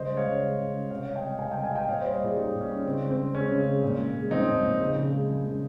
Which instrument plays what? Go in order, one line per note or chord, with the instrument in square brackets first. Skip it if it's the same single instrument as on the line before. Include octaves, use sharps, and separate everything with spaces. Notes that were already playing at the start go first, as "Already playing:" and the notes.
Already playing: [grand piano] C#3 G3 C5 D#5
G#3
C#5 F5
C#3
G#3
C#3
G#3
C3 C#5 F5
G3 F5
D#5 G5
C3
G3 F5 G#5
D#5 G5
C3
F5 G#5
G3 D#5 G5
A#2 C#5 F5
G3 C5 D#5
A#2 F4 G#4
G3 D#4 G4
A#2
C#4
G3
C#3 C4
G#3
C4
C#3
G#3 C#4
C#3
G#3
A#2
A#2
G#3
F3 C4 D#4
A#2
A#2
C#3
C#3
G#3
F3
C#3